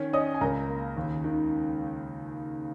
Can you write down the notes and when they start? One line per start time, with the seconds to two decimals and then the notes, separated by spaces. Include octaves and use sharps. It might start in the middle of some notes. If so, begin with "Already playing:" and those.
Already playing: D#3 C#4
0.13 C#4 D#5 D#6
0.34 G#5
0.41 C#2 A#4 A#5
0.68 A#3
0.96 D#2
1.24 D#3